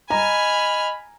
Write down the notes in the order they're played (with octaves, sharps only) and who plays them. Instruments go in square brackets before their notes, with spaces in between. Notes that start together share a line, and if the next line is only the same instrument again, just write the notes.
[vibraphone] D#5 [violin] G#5 F6 [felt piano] A#5 [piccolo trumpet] B5